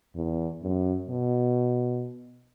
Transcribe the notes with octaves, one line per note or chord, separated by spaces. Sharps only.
E2
F#2
B2